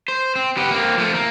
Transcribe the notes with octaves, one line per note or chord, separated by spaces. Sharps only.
C5
C4
B3 G4
A#3 C4
F3 A3
A#3